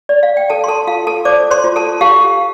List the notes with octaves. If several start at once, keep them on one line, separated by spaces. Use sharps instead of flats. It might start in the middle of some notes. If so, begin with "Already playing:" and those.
D5
F5
G5
A4 A5
C6
A4 A5
F4 F5
A4 A5
C5 D5 D6
C5 C6
F4
A4 A5
G4 F5